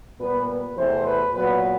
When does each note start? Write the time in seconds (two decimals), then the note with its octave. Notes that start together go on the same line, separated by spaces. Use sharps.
0.19 A#2 G3 B3 B4
0.48 B4
0.76 E2 C3 E3 A3 C4 C5
1.06 B4
1.33 A#2 F#3 B3 B4